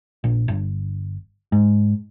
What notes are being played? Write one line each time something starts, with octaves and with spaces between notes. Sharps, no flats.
A#1
G1
G#2